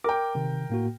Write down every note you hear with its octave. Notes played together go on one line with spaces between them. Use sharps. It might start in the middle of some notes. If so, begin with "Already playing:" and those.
A#4 G5 D6
C3 D#3
A2 A#3 F#4